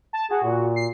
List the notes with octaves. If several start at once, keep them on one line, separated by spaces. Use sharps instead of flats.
A5
F#4 G#4
A#2
C7